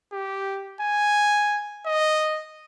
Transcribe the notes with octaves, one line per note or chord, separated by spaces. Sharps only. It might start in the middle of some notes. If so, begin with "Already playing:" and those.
G4
G#5
D#5